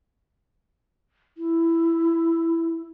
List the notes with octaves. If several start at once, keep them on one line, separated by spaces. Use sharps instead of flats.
E4